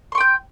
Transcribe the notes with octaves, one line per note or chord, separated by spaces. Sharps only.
G5 C6 C#6 G6